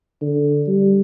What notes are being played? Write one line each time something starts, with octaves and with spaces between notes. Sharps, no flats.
D3
G3